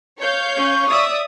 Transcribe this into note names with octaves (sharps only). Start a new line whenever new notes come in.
C#5 F5 G6
C#4 C#6
D5 E5 D#6